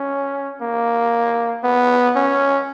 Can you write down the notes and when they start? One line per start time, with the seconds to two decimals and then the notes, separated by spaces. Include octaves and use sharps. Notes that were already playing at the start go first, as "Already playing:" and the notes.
Already playing: C#4
0.61 A#3
1.64 B3
2.16 C#4